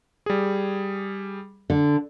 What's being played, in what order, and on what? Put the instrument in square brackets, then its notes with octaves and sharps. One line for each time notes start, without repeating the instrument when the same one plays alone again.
[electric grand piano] G3 G#4
[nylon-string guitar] D3